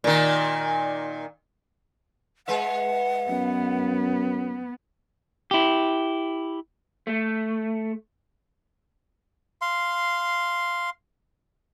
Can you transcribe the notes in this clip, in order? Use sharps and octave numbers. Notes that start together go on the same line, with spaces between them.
A#2 D#3
G#3 B4 E5 F#5
F#2 B3
E4 G4
A3
F5 C6